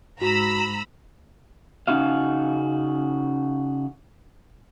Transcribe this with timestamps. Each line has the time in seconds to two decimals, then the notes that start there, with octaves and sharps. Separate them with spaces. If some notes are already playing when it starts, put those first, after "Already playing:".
0.21 G#2 F#4 A#5 B5 E6
1.87 C#3 C#4 D#4 F#4 F5